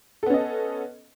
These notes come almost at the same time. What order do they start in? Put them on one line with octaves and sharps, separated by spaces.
A4 B3 C#4 D#5